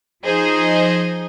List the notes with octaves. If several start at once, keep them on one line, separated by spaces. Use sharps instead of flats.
F3 D#4 G#4 C5 D#5